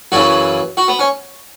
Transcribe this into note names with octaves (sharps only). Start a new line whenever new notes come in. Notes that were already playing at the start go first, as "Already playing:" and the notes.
F#2 C#3 E3 F#4
F#4
B3
C#4